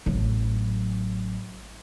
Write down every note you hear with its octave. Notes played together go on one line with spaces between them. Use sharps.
A1 F#3